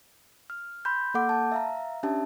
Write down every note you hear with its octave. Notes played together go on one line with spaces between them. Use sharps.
F6
B5 C6 G6
A#3 A4 F#5 D6 G6
A5
E5 F5 A#5
C#4 D4 G4 E5 A5